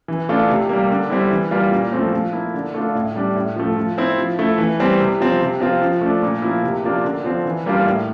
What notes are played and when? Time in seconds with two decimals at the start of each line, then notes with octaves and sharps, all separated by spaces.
0.08 E3
0.29 A3 D4 F4
0.49 C3
0.69 G3 A#3
0.91 D3
1.10 G3 C4 E4
1.31 E3
1.51 G3 A#3 F4
1.72 A#2
1.92 F3 A3 C4
2.13 F3
2.33 A#3 E4
2.54 D3
2.74 A3 D4 F4
2.95 A2
3.16 G3 D4
3.35 A2
3.56 F3 A3
3.76 F3
3.98 C4 E4
4.18 F3
4.39 A3 E4
4.58 E3
4.80 G3 C4
5.00 C3
5.21 F3 C4
5.41 C3
5.60 F3 C4 F4
5.82 F3
6.01 A3 D4
6.23 A#2
6.42 F3 A#3 E4
6.64 C3
6.84 F3 A#3 D4 F4
7.04 D3
7.24 F3 C4
7.46 E3
7.66 G3 A#3 D4 F4
7.86 A2